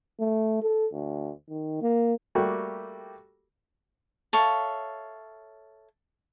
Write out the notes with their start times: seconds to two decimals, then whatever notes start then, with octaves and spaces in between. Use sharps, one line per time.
0.20 A3
0.62 A4
0.93 D2
1.49 D#3
1.82 A#3
2.35 G3 A3 A#3 F#4 G4
4.33 A4 C#5 E5 F5